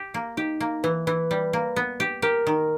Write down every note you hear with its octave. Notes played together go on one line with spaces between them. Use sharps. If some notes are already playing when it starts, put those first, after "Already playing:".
Already playing: G4
A#3
D#4 G4
A#3
E3 B4
E3 B4
G3
A#3
B3
G4
G4 A#4
D#3